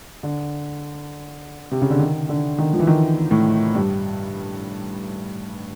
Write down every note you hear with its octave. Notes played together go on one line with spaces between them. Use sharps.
D3
C3
C#3
D3
D#3
D3
D#3
F3
E3
D#3
A2
G2